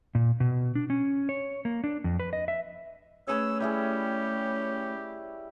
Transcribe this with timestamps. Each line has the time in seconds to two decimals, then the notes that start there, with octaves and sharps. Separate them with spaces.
0.15 A#2
0.40 B2
0.75 D4
0.90 C#4
1.29 C#5
1.65 A#3
1.84 D4
2.04 F2
2.20 B4
2.33 D#5
2.48 E5
3.28 A3 C#4 G#4 B4 C#5 E6
3.60 G3 E4 G4 G#4